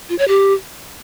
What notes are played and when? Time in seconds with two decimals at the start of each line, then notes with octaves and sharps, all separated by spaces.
0.09 F4
0.19 C#5
0.28 G4